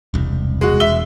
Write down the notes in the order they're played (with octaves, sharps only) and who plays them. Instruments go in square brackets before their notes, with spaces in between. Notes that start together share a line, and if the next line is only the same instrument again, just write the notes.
[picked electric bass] E1 C2
[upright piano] G#3 F#4
[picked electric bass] E1 [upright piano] E5 G7